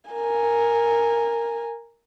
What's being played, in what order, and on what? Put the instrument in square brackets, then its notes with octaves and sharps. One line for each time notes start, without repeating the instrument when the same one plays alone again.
[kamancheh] A#4 G#5